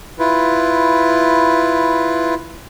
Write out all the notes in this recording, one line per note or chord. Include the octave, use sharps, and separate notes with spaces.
E4 F4 B4